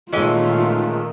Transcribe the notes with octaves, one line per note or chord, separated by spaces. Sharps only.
A#2 D#3 E3 G#3 A3 C#4 F4